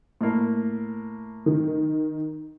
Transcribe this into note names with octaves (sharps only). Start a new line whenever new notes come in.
A2 A#3
D#3